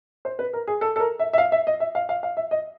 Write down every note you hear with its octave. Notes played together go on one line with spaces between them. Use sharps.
C5
B4
A#4
G#4
A4
A4
A#4
E5
E5
F5
E5
D#5
E5
F5
F5
F5
E5
D#5